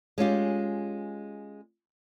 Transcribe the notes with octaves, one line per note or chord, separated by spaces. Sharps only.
G#3 C#4 F4 G4